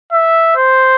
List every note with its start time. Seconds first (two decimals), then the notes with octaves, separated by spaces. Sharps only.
0.12 E5
0.56 C5